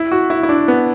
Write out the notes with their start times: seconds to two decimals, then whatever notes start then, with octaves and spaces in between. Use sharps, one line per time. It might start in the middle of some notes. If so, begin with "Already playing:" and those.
Already playing: E4
0.11 F#4
0.30 E4
0.43 E4
0.49 D4
0.68 B3